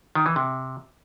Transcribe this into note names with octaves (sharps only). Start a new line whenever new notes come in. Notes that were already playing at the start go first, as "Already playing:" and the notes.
D#3
E3
C3